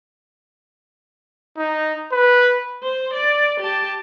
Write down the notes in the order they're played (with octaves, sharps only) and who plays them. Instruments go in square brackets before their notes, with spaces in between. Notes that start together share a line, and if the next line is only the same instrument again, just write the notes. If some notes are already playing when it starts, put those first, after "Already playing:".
[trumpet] D#4
B4
[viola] C5
D5
G4 A5